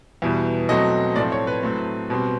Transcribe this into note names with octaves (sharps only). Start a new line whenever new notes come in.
E2 B2 G3
B2 F#3 A3 C4 D#5
A2 F3 A3 C4 D5
C#5
B4
A2 F#3 A3 C4
B2 G3 C4